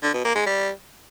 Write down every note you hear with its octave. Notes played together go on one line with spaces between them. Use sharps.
D3
B2
A#3
G#3
G3